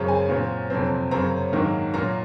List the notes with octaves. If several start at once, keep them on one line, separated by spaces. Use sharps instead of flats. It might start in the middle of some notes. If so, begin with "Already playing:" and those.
Already playing: F#2 C#3 G#3 C4
G#5
A#2 F#3 C4
F2 C3 F#3 C4
F#2 C#3 F#3 C4 A#5
G#2 D#3 F#3 A#3
A#2 F#3 A#3 A#5